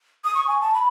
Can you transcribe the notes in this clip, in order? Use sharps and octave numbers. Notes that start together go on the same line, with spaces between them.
D#6
C#6
G#5
A5
B5